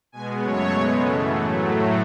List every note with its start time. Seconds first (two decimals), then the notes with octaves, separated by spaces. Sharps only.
0.12 B2 G#3 B3 G#5
0.42 F#2 C#3 F#3 A3 C#5
0.72 B2 G#3 B3
1.00 F#2 C#3 E3 A3 A4
1.30 A2 F#3 A3 G#4